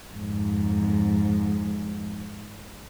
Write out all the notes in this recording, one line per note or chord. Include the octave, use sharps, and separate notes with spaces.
F2 G#2